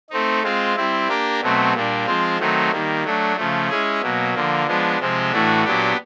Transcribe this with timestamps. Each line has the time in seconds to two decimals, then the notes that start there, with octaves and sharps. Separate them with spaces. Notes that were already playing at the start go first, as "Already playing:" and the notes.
0.10 A3 C4 D#4
0.43 G#3 C4 F4
0.76 G3 C4 E4
1.08 A#3 D4 G4 A#4
1.41 B2 F#3 A3 C4
1.74 A#2 G3 A#3 D4
2.06 F3 G#3 C4 F4
2.39 D#3 F#3 A3 C4 D#4
2.71 D#3 G3 A#3
3.04 F#3 A3 D4
3.37 C#3 F3 A3
3.69 G#3 C#4 E4 G#4
4.01 B2 F#3 A#3
4.34 D3 F3 A#3
4.67 F3 G#3 B3 D4
5.00 C3 F3 G#3 C4
5.32 A2 E3 A3 D4 F#4
5.65 A#2 F#3 B3 D4 G4